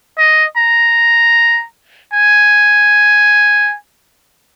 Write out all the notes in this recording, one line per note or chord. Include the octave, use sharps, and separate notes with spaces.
D#5
A#5
G#5